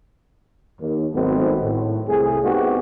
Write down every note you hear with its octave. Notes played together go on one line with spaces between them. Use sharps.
D#2
G#1 D#3 F#3 A3 B3 C4
A2
C2 A2 A3 G#4
A3 B3 C4 D#4 F#4 G4